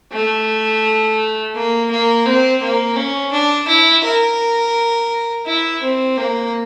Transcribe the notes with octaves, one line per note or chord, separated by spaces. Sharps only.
A3
A#3
A#3
C4
A#3
C#4
D4
E4
A#4
E4
C4
A#3